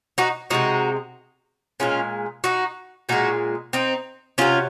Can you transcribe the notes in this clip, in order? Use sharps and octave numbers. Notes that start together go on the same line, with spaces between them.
D#4 F#4
C3 F3 G#3 D#4 F#4
A#2 G#3 C#4 F4
D#4 F#4
A#2 G#3 D#4 F#4
C4 D#4
C3 F#3 C#4 F4